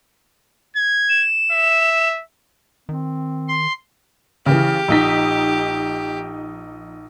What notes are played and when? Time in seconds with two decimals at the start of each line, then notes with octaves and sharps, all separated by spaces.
0.77 G#6
1.09 E7
1.52 E5
2.89 D#3 C4
3.49 C6
4.46 C#3 E3 G4
4.88 A#1 D#4 B6